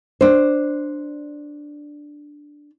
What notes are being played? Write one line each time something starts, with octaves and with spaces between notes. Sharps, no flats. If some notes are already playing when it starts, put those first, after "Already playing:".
D4 C5